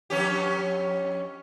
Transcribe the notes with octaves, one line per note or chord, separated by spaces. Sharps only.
F2 C#4 G4